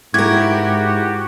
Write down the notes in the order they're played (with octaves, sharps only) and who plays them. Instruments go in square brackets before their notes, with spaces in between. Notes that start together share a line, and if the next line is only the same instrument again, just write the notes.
[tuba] G#2 [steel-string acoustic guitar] E4 A#4 [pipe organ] F#4 G4 [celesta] G#6